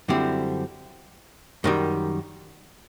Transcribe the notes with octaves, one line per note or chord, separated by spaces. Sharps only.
F#2 D3 G3 C4 E4
F#2 D#3 G3